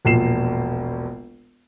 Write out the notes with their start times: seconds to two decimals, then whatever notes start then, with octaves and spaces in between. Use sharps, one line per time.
0.05 E1 A#1 F3 C7 E7